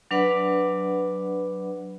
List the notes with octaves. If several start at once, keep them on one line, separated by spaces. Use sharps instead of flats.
F#3 D4 B4 D5 F#5 B5